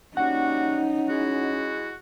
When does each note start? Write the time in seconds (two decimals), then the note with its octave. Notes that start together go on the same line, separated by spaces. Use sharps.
0.17 G3 A#3 C#4 D#4 F#4 F#5
1.09 G#3 E4 F#4